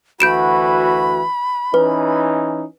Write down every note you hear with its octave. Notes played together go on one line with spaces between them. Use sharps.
D2 E3 F#4 B5 G6 D7 E7
E3 C#4 D#4 B4